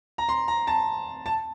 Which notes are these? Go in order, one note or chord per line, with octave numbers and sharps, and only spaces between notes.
A#5
C6
A#5
A5
A5